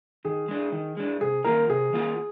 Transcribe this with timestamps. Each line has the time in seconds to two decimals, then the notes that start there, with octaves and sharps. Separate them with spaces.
0.25 D#3 G#4
0.48 G#3 D4
0.72 D#3
0.97 G#3 D4
1.21 C3 G#4
1.44 D#3 A#3 F4 A#4
1.69 C3 G#4
1.93 D#3 A#3 F4